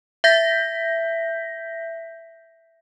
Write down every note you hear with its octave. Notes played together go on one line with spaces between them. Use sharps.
E5 G6 A#6 B6